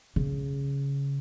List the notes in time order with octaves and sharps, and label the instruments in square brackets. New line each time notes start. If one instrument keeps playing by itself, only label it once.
[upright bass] C#3